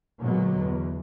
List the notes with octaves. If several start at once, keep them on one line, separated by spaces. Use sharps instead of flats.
A#2 D3 F#3 G#3 B3
E2